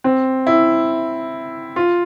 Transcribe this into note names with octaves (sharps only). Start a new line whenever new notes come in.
C4
E4
F4